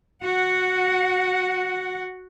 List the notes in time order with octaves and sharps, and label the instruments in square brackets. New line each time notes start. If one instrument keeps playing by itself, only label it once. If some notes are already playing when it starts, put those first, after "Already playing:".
[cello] F#4 F#5